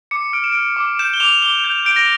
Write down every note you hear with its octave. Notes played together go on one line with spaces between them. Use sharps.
D6 C#7
F6 D7
E7
F6 D7
D6
G6 E7
G7
D6 F7
D6 G7
G6 F7
G6 D7
A#6